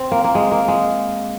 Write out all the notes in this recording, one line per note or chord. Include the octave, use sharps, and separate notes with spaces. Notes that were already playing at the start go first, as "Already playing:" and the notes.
Already playing: C4
A#3
A#3
G#3
A#3
G#3